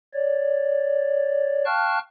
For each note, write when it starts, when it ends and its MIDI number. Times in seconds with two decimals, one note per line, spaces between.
0.14 1.65 73
0.14 1.65 74
1.66 1.98 77
1.66 1.98 79
1.66 1.98 81
1.66 1.98 85
1.66 1.98 89
1.66 1.98 90